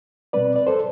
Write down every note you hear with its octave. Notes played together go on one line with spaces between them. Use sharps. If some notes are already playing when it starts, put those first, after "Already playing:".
B2 G3 C4 B4 D5
D5
A4 C5